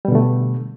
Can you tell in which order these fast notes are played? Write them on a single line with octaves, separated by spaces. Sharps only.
G3 B2 D3 A3